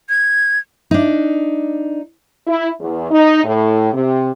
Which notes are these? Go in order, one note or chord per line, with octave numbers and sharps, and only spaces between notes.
G#6
D4 D#4
E4
E2
D#4
A2
C3